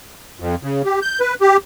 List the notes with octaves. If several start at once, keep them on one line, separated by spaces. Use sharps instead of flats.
F2
C#3
G4
G6
B4
G4